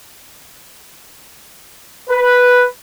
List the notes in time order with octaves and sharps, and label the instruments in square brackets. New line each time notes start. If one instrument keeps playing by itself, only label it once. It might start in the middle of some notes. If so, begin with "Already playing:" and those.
[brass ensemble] B4